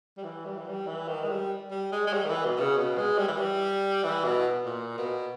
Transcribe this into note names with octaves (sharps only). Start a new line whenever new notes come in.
G3
E3
G3
E3
G3
E3
D#3
G#3
G3
G3
G#3
G#3
G3
D#3
E3
B2
B2
C#3
B2
G#3
G3
E3
G3
E3
B2
A#2
B2